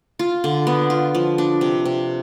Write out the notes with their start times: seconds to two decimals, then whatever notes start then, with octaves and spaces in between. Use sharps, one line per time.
0.19 F4
0.44 D3
0.67 B3
0.90 F4
1.15 F3
1.38 D4
1.61 C3
1.85 C3